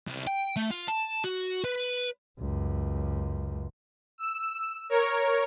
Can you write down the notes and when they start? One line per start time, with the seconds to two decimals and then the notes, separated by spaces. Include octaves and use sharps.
0.08 C2
0.27 G5
0.56 A3
0.71 F4
0.88 A5
1.24 F#4
1.64 B4
2.39 C#2 F#2
4.18 E6
4.89 A#4 C#5